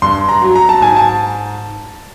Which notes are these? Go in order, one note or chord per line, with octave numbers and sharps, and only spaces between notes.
G2 C6
A#5
F#3
A#5
A5
G#2 G#5
A5